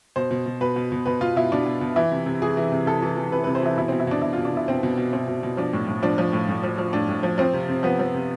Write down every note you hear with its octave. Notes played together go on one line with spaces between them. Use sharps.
B2 C5
B2
B2
B2 B4
B2
B2
B2 B4
B2 F4
B2 E4
B2 D4
B2
B2
E3 E4
C3
C3
E3 G#4
E3
C3
C3 A4
E3
E3
C3 B4
C3 B4
C5
E3 E4
B2 E4
B2 C4
E4
B2 D4
B2 E4
B2 F4
D4
B2 E4
B2 C4
B2
B2
B2 C4
B2
B2
F3 D4
A2
A2
F3 D4
F3
A2
A2
F3
F3
A2 D4
A2
F3
F3 C4
C3
C3
F3 B3
F3
C3